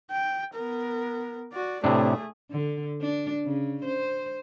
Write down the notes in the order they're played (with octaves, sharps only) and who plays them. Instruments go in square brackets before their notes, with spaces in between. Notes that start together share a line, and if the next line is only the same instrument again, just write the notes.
[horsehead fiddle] G5
B3 A#4
F#4 D5
[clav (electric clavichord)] A2 C3 D4 [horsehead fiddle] A3 G#4
[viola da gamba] D3
D4
C#3
C5